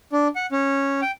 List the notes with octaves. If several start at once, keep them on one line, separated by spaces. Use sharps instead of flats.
D4
F#5
C#4
G5